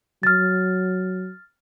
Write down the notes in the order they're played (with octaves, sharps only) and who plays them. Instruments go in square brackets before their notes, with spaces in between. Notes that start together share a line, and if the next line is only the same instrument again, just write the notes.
[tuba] F#3 [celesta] F6 A6